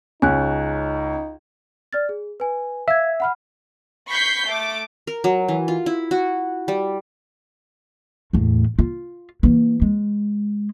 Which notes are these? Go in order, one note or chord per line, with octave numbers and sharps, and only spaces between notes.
C#2 C#4 D#4 G#5 F#6
D5 F6 A6
G#4
B4 G#5
E5 F5 E6 G#6
F#5 B5 F6
B5 C#6 G6 B6 C7
A3 D6
A#4
F#3
E3
F4
E4
F#4
G3
E2 A2
F4
E3 A#3
G#3